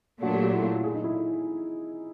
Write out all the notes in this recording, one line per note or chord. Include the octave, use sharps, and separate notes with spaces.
A#2 F#3 A3 D4 F#4
G4
F#4
E4
F4
G#4
D#4
E4
F4